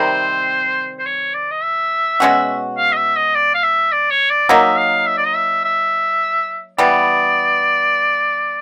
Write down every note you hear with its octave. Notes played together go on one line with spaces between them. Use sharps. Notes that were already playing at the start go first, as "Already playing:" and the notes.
Already playing: C3 D#3 G3 C4 C5
C5
C#5
D5
D#5
E5
B2 G#3 C#4 F#4
F5
D#5
E5
D#5
D5
F5
E5
D5
C#5
D5
F#3 A#3 D#4 E5
F5
E5
D5
D#5
E5
E5
E3 G3 B3 D5